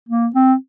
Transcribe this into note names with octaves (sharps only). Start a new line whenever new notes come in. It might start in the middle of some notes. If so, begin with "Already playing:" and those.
A#3
C4